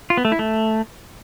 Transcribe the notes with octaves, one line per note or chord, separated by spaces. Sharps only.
F4
B3
A3
E4
A3